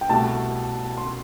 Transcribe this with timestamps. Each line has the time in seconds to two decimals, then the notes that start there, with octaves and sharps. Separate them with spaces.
0.01 G5
0.09 C2 B2 A3 E4 G4 A5
0.97 C6